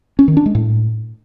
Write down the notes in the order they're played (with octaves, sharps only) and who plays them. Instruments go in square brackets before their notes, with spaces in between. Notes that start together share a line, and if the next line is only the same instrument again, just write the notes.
[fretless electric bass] C#4
D#3
D4
G#3
A2